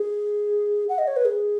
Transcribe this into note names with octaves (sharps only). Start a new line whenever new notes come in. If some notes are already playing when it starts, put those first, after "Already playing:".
Already playing: G#4
F#5
D#5
C#5
B4
G#4